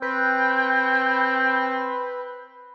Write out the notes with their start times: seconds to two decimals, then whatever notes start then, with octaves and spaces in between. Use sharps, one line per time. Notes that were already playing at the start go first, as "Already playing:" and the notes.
0.02 C4 B4 G5